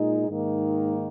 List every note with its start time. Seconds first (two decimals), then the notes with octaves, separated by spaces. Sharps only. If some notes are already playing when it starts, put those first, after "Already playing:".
Already playing: A#2 G#3 D#4
0.27 G#2 D#3 A#3 D#4